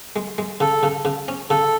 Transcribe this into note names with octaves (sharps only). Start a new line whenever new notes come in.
G#3
G#3
C#3 A4
C#3
C#3
C#4
C#3 A4